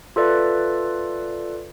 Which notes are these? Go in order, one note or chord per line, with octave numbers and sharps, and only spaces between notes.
F4 A4 B4 D5 E5